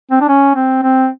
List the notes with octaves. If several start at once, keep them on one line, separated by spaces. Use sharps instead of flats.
C4
D4
C#4
C4
C4